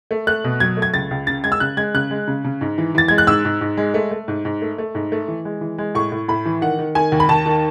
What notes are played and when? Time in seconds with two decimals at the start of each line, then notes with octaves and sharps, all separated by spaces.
0.11 A3
0.27 A3 F#6
0.44 B2
0.60 F#3 G#6
0.77 A3
0.82 G#6
0.94 C#2 A6
1.11 C#2
1.27 C#3 A6
1.44 G#3 G#6
1.52 E6
1.60 C#3 F#6
1.77 G#3 G#6
1.94 C#3 F#6
2.11 G#3
2.28 C#3
2.45 C#3
2.61 G#2
2.78 E3
2.95 E3 A6
3.08 G#3 G#6
3.18 F#6
3.27 G#2 E6
3.45 G#2
3.61 G#2
3.77 G#3
3.94 A3
4.11 A3
4.28 G#2
4.45 G#2
4.62 A3
4.78 A3
4.95 G#2
5.12 A3
5.28 E3
5.45 G#3
5.61 E3
5.78 G#3
5.95 A2 C#6
6.12 A2
6.28 A2 B5
6.45 E3
6.62 D#3 F#5
6.79 D#3
6.95 D#3 G#5
7.12 D#2
7.20 B5
7.29 D#2 A5
7.46 D#3